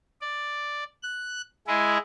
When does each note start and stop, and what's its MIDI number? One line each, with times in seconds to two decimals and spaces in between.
0.21 0.84 74
1.03 1.42 90
1.67 1.98 56
1.67 1.98 64
1.67 1.98 68